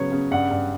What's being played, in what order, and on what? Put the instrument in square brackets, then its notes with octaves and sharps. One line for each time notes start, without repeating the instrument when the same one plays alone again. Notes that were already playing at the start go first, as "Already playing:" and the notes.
Already playing: [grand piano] C#3 F#3 B3 C#5
C#3
G2 F#5
G2